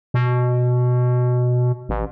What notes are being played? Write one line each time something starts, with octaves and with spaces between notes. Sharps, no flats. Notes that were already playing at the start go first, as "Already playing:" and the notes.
B2
A1